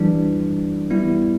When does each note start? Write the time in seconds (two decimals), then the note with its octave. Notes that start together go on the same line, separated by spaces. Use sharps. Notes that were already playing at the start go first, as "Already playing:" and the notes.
Already playing: E3 G3 D4
0.90 G3 B3 E4